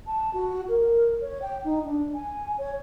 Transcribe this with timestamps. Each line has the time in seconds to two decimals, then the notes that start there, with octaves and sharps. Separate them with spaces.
0.07 A5
0.34 F#4
0.69 A#4
1.21 C#5
1.42 G5
1.64 D#4
1.84 D4
2.15 G#5
2.58 C#5